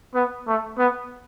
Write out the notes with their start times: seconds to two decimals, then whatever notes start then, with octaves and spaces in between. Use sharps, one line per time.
0.14 B3
0.47 A3
0.78 B3